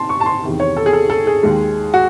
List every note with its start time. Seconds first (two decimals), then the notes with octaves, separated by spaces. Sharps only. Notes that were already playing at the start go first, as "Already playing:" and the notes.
Already playing: C3 A5 C6
0.09 C#6
0.20 A5
0.26 C6
0.43 E2 C3 D#3
0.60 C#5
0.77 A4
0.86 G#4
0.93 A4
1.10 A4
1.27 G#4
1.43 D#2 D#3 G#3
1.94 F#4